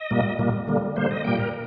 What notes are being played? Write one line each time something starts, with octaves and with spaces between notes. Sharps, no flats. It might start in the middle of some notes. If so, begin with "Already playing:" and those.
Already playing: D#5
A#2 G3 A#3
A#2 G3 A#3
D3 G3 A#3
D3 G3 A#3 C5
D#5
A#2 G3 A#3 G5
A#4